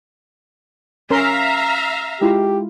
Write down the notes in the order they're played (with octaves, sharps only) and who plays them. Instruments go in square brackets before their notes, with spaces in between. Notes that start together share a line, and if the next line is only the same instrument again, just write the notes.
[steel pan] C#4 A#4 C6 [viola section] E5 F5 A#5
[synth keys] G#3 E4 F4 [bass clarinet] G4